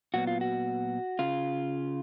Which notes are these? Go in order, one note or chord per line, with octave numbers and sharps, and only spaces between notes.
A#2 F#3 B3 F#4
F4
F#4
C#3 F4